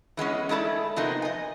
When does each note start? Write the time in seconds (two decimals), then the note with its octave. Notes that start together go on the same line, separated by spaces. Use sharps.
0.17 E3 G#3 B3 C#4
0.49 G#3 A3 E4 A4 D5
0.96 C3 F3 A#3 B3 D#4
1.22 D#5 G#5